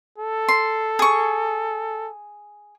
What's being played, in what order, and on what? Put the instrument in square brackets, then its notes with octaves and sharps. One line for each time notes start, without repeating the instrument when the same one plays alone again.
[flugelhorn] A4
[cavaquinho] C6
G#4 C#6